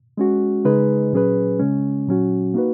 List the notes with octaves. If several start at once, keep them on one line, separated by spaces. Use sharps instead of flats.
G#3 C#4 F#4
C#3 G#3 D#4 G#4 B4
A#2 F#3 C#4 G#4 B4
C#3 G#3 C#4
A#2 F#3 C#4 F#4
A#3 D#4 F#4 B4